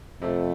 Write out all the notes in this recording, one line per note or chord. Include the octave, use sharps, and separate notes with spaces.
F2 C3 F3 A3